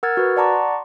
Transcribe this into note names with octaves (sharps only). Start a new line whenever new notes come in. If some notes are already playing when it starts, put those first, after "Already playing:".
A#4 F#5 E6 F6 G#6 A6
F#4 B4
D5 F#5 A5 A#5 C#6 D6
C6